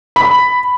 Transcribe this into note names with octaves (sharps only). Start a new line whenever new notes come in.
B5